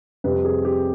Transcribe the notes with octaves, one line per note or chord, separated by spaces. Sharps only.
F2 C3 G3 B4
G#4
G4